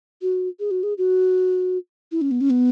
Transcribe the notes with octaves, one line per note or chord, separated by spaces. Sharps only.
F#4
G#4
F#4
G#4
F#4
E4
C#4
B3
C#4
B3